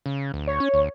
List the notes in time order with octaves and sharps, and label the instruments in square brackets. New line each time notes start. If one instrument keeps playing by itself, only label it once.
[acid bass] C#3
D2
[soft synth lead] C#5
[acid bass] C#4
D2